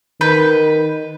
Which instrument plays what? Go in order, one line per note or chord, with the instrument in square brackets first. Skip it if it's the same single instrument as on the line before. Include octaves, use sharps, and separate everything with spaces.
[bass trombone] D#3 [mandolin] B4 G6